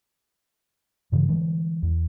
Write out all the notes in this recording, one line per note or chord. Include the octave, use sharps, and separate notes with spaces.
G2 C#3 E3
D3 E3 G3 G#3
E2